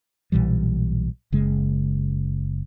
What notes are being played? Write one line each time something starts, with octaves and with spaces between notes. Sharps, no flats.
B1 A#2 E3 G3
F#1 C#3 G#3